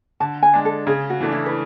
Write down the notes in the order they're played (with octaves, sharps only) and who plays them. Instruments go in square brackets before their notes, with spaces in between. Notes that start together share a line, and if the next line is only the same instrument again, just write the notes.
[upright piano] D3 [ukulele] A5
[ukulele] G#5
[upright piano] G#3 D4
[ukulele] A4
[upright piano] C#3 [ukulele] G#4
[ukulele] F#4
[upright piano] E3 A3 D4
[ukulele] E4
B4